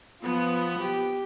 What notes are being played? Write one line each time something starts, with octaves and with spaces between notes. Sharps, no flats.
F3 B3
G4